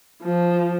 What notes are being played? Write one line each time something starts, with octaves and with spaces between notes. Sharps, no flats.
F3